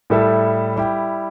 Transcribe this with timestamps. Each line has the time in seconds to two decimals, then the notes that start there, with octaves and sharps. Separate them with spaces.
0.10 A2 G3 E4 A4 E5
0.76 G3 E4 G4